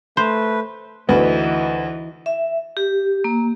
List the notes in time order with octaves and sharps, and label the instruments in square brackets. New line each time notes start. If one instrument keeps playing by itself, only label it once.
[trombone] A3 [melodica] B4 [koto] C5
[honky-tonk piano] D2 [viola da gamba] E3 D#4 [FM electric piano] B4
[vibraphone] E5
G4
A#3